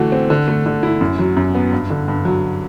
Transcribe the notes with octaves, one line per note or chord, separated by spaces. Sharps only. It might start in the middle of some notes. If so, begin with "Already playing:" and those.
Already playing: D3 E3 A3 F#4
C4
D3
A3
D3
E4
F#2
F#3
F#2
B3
G2
D3
G2
F#3